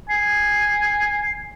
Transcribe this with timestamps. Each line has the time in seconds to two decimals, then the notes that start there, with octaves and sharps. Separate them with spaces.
0.09 G#5 C7